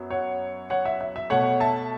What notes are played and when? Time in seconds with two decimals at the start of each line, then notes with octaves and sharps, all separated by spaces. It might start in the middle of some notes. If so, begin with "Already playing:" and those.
Already playing: F#2 F#3 B3
0.10 C#5 F#5
0.70 C#5 F#5
0.85 E5
1.01 E5
1.16 E5
1.30 B2 A3 C#5 F#5
1.60 E5 A5